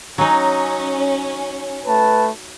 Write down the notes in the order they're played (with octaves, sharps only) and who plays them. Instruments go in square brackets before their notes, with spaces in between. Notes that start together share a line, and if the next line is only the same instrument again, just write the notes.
[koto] F#3 D#4 [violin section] C#4
[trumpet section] A3 B4 A5